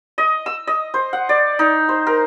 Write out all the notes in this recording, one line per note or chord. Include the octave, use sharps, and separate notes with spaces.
D#5
E6
D#5
C5
F#5
D5
D#4
C5
A#4